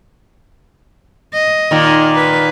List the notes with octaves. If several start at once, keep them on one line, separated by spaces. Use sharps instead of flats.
D#5
A#2 D#3
B4